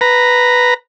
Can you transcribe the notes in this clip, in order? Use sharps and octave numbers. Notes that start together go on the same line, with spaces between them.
B4 A#5